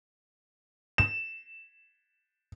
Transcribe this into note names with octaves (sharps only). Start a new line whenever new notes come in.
E7